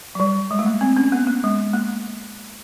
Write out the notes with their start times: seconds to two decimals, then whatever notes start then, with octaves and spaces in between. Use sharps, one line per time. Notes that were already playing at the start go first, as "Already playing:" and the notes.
0.15 F#3
0.20 G3
0.51 G#3
0.59 A3
0.66 A#3
0.81 C4
0.97 C#4
1.12 B3
1.27 A#3
1.44 G#3
1.74 A#3